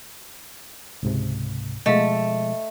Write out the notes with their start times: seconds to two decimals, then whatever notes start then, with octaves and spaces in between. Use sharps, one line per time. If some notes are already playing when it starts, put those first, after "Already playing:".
1.03 C#2 G#2 C3
1.86 B2 F3 G#3 A3 D#5 F5